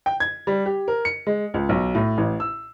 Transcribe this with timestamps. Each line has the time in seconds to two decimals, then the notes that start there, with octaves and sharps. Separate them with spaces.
0.06 G5
0.20 G#6
0.47 G3
0.66 G4
0.88 A#4
1.05 C#7
1.27 G#3
1.54 C#2
1.69 B1
1.95 A2
2.18 A1
2.40 E6